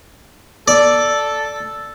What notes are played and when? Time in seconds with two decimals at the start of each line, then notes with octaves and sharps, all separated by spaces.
0.68 A4 D5